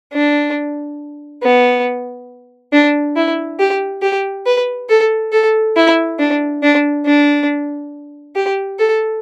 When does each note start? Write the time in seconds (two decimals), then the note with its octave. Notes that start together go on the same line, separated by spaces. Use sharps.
0.13 D4
1.43 B3
2.73 D4
3.16 E4
3.59 G4
4.02 G4
4.46 B4
4.89 A4
5.32 A4
5.76 E4
6.19 D4
6.63 D4
7.06 D4
8.36 G4
8.79 A4